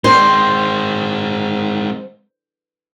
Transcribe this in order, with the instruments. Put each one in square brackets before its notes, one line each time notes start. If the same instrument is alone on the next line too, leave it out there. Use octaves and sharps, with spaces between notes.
[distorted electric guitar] G#3 C4 [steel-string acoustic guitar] C5